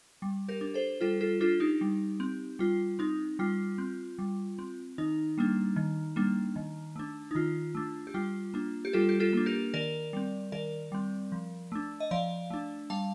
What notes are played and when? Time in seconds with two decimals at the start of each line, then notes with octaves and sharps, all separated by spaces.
0.22 G3
0.48 G4 A#4
0.61 D4
0.74 A4 C5
1.01 G3 F4 A4
1.21 F4 A4
1.40 D4 F4 A4
1.60 D#4 G4
1.81 G3
2.20 C4
2.59 G3 F4
2.99 C4 D#4
3.39 G3 F4
3.78 C4
4.19 G3
4.59 C4
4.98 D#3 D#4
5.38 G3 A#3 D4
5.76 D#3
6.16 G3 A#3 D4
6.56 D#3
6.96 A3 D4
7.31 D#4
7.35 D#3 F4
7.75 A3 D4
8.07 G4
8.14 G3 F4
8.54 A#3 D4
8.85 G4
8.93 G3 F4 A4
9.09 G4
9.20 F4 A4
9.33 A#3 D4
9.46 G4 A#4
9.74 D#3 A#4 D5
10.13 G3 C4
10.52 D#3 A#4 D5
10.92 G3 C4
11.32 F3
11.72 A3 D4
12.00 D#5
12.11 F3 D5 F5
12.50 A3 D4
12.90 G3 F5 A5